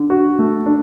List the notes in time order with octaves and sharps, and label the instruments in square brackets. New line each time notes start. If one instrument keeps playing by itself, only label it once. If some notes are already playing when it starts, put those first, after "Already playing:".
Already playing: [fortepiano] D3
F#4
A3
D4